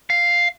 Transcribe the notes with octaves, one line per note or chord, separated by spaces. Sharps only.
F5